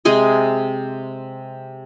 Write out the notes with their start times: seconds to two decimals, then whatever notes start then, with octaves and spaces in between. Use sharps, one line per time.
0.05 C3 G#3 G#4 D#5